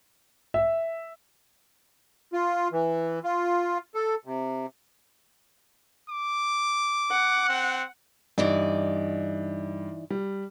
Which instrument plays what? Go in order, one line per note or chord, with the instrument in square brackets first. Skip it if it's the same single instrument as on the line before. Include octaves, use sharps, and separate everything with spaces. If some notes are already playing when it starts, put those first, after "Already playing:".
[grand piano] E5
[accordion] F4
E3
F4
A4
C3
[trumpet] D6
[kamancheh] F#5
[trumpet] C4
[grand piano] G2 [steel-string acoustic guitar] E3 D#4 D5
[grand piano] G3